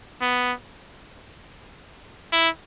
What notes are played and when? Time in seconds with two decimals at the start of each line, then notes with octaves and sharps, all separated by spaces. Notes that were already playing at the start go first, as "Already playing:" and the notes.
0.21 B3
2.33 E4